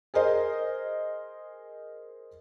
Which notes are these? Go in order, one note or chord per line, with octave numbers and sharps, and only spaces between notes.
G#4 A#4 C5 D#5